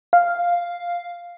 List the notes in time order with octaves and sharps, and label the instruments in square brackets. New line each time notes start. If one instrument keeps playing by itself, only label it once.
[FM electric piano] F5